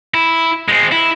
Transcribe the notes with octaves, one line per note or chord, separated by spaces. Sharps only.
E4
G#3 C4
E4